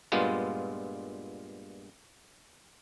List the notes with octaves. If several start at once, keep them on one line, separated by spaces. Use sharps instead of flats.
G2 A#2 G#3 B3 F4